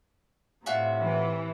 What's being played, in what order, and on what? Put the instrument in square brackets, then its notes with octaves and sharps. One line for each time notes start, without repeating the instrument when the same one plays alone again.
[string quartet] A2 C3 [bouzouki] F4 F#4 E5
[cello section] E3